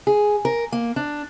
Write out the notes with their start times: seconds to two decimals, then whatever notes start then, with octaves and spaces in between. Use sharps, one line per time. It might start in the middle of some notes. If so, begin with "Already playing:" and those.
0.07 G#4
0.45 A#4
0.72 A#3
0.96 D4